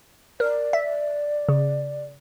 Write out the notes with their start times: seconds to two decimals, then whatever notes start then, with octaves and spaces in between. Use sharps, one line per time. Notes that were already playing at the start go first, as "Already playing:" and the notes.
0.40 A#4 D5
0.73 E5
1.49 C#3